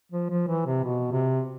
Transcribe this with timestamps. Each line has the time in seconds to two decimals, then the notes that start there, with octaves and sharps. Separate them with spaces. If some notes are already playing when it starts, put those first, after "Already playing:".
0.12 F3
0.30 F3
0.48 E3
0.66 C3
0.84 B2
1.12 C3